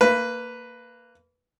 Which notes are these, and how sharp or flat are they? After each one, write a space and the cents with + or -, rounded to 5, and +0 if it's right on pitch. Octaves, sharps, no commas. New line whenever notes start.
A#3 -20 B4 +0